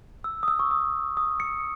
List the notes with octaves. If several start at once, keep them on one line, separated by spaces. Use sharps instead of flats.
E6
D#6
E6
C#6
D#6
D#6
C#7